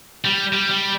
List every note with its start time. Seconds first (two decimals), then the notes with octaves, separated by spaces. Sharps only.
0.25 G3
0.53 G3
0.70 G3